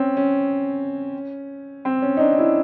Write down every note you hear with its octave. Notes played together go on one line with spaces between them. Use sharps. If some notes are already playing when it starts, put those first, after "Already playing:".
Already playing: C4 C#4
C#4
C4
C#4
D#4
D4
D#4
E4